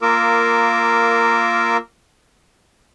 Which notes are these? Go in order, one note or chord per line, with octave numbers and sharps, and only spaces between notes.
A#3 F4 A#4 D6 E6